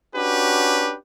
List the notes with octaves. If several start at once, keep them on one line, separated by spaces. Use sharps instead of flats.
C#4 D4 F#4 G4 B4